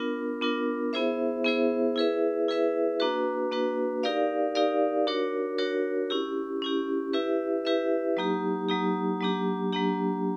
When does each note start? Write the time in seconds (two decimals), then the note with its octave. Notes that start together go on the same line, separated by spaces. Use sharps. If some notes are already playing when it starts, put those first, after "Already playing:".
Already playing: B3 D4 F4 A#4
0.41 B3 D4 F4 A#4
0.93 B3 E4 G#4 C5 E5
1.45 B3 E4 G#4 C5 E5
1.96 E4 G#4 B4 E5
2.48 E4 G#4 B4 E5
3.00 A#3 D4 F#4 B4
3.52 A#3 D4 F#4 B4
4.03 D#4 G4 A#4 D5 F5
4.55 D#4 G4 A#4 D5 F5
5.07 D4 F#4 A#4 C#5
5.58 D4 F#4 A#4 C#5
6.10 C#4 E4 G4
6.62 C#4 E4 G4
7.13 E4 G4 B4 E5
7.65 E4 G4 B4 E5
8.17 F#3 A#3 D#4 G4
8.69 F#3 A#3 D#4 G4
9.21 F#3 A#3 D4 G4
9.73 F#3 A#3 D4 G4